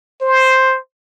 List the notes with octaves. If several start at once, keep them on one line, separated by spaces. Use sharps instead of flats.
C5